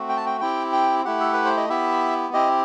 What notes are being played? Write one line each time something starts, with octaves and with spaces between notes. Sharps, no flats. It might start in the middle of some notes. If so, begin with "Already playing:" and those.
Already playing: A3 C4 F#4
G5
A5
G5
C4 E4 G4 G5
G5
A3 E4 G4 F#5
A4
B4
C5
D#5
B3 E4 G4 E5
C4 E4 G4 D#5